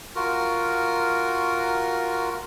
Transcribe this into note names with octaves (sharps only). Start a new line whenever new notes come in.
F4 F#4 A#4